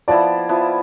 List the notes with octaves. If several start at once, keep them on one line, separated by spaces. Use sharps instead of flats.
F3 B3 E4 D5
F3 B3 E4